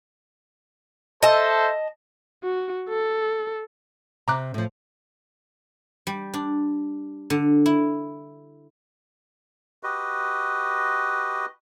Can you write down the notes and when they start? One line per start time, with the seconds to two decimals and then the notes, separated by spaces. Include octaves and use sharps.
1.23 A4 C5 D#5 E5 A5
2.43 F#4
2.89 A4
4.28 C3 A#5 D6 F#6
4.54 A2 F3
6.07 G3
6.34 D4
7.30 D3
7.66 E4
9.83 F#4 G4 B4 D#5